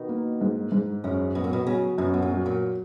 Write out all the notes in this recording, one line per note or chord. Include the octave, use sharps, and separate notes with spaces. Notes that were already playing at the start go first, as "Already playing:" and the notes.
Already playing: B2 D#3
A#3
G#2
G#2
F#2 C#3
B2 F#3
A#2
B2
C#3 F#3
F#2 B2
B2
A#2
F#3
A#2